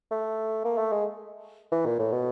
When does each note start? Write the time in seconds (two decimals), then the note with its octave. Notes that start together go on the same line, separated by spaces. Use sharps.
0.11 A3
0.65 A#3
0.78 A3
0.92 G#3
1.72 E3
1.86 A#2
1.99 A2
2.12 B2